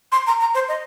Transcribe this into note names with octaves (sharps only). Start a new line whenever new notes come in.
C6
A#5
A#5
C5
D#5